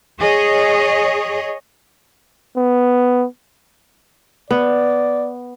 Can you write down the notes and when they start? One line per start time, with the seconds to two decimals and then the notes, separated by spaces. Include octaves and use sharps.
0.19 G#4 C#5 D#5
2.58 B3
4.51 B3 D5